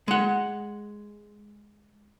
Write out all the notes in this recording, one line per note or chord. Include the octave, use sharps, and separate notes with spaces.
G#3 F#5